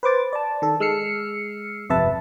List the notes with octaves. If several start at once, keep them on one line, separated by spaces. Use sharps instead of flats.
B4 C5 D6 A6
D5 A5
D#3 A4
G#3 E6 F6 C7 C#7
G1 F2 C3 B4 E5 A5